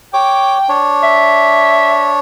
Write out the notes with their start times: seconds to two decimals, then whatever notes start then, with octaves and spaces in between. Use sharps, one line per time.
0.14 C#5 G5 D6
0.69 D4 C#5
1.03 E5